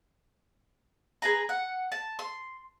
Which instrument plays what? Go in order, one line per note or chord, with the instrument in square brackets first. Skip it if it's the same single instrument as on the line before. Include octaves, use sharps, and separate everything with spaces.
[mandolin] G#4 B4 A#5
F#5
A5
C6